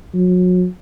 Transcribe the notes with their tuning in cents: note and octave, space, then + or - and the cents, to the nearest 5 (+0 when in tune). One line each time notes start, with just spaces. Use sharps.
F#3 -35